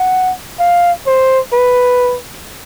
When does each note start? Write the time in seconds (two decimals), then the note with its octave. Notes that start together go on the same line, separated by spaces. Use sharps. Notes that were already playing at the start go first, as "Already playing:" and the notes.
Already playing: F#5
0.59 F5
1.07 C5
1.53 B4